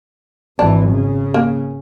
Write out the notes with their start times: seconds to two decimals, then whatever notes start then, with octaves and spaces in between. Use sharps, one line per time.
0.59 G#1 E3 D4
0.90 C#3
1.34 A#3